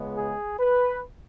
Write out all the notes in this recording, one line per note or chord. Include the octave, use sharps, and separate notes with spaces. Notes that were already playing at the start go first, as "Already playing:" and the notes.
Already playing: C#2 C#3 G#3 B3
G#4
B4